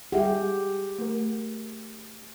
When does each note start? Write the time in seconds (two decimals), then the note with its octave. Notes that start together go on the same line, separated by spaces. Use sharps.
0.12 G3 G4 G#4 E5 F#5
0.98 A3 A#4